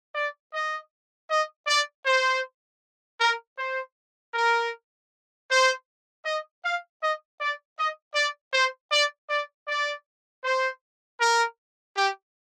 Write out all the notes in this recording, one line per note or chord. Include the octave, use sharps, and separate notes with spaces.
D5
D#5
D#5
D5
C5
A#4
C5
A#4
C5
D#5
F5
D#5
D5
D#5
D5
C5
D5
D5
D5
C5
A#4
G4